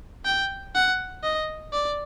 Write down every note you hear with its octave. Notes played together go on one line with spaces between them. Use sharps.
G5
F#5
D#5
D5